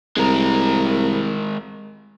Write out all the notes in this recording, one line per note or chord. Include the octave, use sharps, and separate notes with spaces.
C2 G#3 A#4